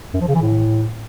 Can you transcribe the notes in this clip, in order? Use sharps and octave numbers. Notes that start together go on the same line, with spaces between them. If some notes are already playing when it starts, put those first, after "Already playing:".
F#2
F3
C#3
E3
A2